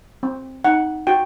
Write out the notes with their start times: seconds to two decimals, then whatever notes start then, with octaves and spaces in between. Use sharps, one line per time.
0.23 C4
0.64 D#4 F#5
1.07 F#4 G5